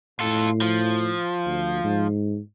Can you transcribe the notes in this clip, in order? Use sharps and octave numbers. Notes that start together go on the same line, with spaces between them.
A2 F4 A4
F3
D2
G#2